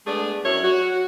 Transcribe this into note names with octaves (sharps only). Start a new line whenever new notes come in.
G#3 A3 B3 D4 G#4
F#2 F#3 E4 F#4 A#4 C#5
F#4